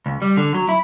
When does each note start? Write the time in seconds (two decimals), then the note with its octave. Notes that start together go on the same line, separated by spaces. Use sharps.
0.06 C#2
0.22 G3
0.37 D3
0.54 F#3
0.69 E4